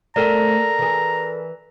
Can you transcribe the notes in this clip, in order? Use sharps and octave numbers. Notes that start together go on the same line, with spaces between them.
A3 C4 A4 A#4 D5 A#5
E3 G#4